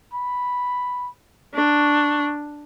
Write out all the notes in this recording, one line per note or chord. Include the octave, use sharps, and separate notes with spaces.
B5
D4 C#6